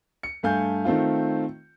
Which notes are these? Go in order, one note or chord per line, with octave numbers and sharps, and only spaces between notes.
C#7
G2 A3 F5 G#5 G6
D#3 A3 C4 F4